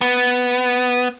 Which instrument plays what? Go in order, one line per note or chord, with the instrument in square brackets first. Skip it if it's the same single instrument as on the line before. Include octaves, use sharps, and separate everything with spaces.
[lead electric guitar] B3